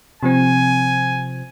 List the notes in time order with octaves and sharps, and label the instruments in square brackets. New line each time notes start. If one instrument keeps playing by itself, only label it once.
[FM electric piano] C3 F3 C4 [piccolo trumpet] G#5